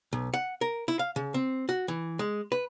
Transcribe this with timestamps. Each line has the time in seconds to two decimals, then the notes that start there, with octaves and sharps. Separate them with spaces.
0.13 B1
0.34 F#5
0.61 A#4
0.88 E4
0.99 F5
1.16 C#3
1.34 C4
1.69 F#4
1.88 E3
2.19 G#3
2.52 B4